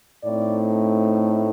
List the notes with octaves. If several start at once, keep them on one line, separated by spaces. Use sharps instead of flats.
A2 A3 C4 D#4 D5